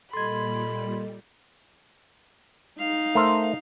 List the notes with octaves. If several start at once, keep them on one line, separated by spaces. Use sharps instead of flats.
A#2 G3 A4 D#5 B5 C6 G#6
D#4 F5
A3 A#4 C5